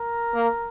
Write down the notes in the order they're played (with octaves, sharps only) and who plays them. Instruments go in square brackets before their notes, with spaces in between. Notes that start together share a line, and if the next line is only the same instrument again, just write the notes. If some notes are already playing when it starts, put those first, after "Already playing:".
Already playing: [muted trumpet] A#4
[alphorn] A#3